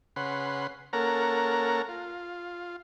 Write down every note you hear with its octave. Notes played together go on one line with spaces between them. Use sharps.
C#3 B4 F#5 C6
A#3 C#4 A4 A#4 F#5 A#5
F4